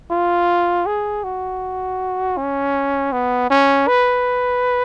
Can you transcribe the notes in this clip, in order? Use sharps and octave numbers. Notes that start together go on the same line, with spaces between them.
F4
G#4
F#4
C#4
B3
C#4
B4